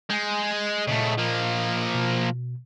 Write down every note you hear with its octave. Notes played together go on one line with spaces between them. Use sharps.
G#3 G#5 G6
A#2 C#3 A3 D#5
F3 A#3
B2